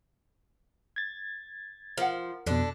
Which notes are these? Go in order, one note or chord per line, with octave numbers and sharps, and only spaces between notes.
G#6 A6
F3 A#4 F#5
F2 B2 D3 D4